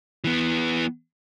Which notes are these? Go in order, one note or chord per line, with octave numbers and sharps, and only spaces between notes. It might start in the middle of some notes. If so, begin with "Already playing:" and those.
E3 B3